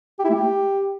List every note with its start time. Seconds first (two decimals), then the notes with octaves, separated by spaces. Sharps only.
0.19 G4
0.24 E4
0.30 A3
0.35 G4